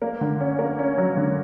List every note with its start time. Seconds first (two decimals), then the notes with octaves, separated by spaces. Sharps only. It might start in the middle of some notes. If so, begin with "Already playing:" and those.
0.02 A#3
0.21 D3
0.40 C#4
0.59 A#3
0.79 C#4
0.98 F#3
1.17 D3